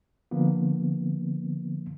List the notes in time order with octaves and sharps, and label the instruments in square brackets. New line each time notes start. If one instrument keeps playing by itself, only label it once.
[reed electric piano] D3 F3 A#3 B3